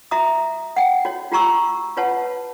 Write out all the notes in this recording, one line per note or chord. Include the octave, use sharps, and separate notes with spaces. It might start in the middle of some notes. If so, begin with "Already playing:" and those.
F#4 E5 A#5 D#6
F#5 G5
F#4 C#5
F4 G4 A#5 C#6 E6
F4 B4 C#5 F#5 A5